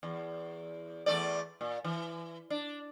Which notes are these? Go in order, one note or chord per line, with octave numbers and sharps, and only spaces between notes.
E2
E2 A3 D5
A#2
E3
D4